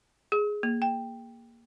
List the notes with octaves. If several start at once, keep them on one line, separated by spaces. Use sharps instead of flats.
G#4
A#3
G5